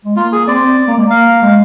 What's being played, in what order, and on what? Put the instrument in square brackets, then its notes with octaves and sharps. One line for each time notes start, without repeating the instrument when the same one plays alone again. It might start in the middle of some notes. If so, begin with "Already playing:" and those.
[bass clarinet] G#3
[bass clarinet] A#3 [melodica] F4
[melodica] G#4
[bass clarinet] C4 [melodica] D5
[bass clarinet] C4
A#3
G#3
[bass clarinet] A#3 [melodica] F5
[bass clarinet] G#3